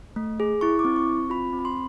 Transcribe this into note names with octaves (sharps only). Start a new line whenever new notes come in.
A3
G#4
E4 C#6
D6
C4
C#6
C4
F4 B5
C4
B5
C6